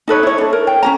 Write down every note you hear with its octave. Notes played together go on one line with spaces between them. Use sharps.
D#4 A4 B4 C#5
E4 C#5
D4 A4
A#4
G5
C#4 F#4 A#5